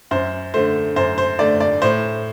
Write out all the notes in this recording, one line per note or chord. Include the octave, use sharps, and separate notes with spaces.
F#2 C5
D3 A3 C5
F#2 C5
C5
D3 A3 D5
D5
A2 C5